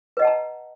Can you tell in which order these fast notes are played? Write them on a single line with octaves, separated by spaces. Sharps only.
B4 D#5 F#5 A5 A#5